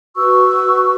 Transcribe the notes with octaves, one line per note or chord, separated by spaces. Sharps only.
F#4 B4 C#6 E6